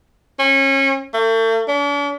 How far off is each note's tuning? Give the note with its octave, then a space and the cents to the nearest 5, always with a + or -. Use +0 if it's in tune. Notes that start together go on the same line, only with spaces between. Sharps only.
C#4 -30
A3 +40
D4 -45